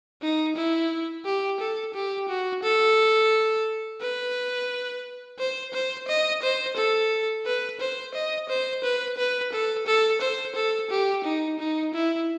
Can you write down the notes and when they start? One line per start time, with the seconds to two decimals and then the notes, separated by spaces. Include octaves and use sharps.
0.22 D#4
0.56 E4
1.26 G4
1.60 A4
1.94 G4
2.29 F#4
2.63 A4
4.01 B4
5.39 C5
5.74 C5
6.08 D#5
6.43 C5
6.77 A4
7.46 B4
7.80 C5
8.14 D#5
8.49 C5
8.84 B4
9.18 B4
9.53 A4
9.87 A4
10.21 C5
10.56 A4
10.90 G4
11.24 D#4
11.59 D#4
11.94 E4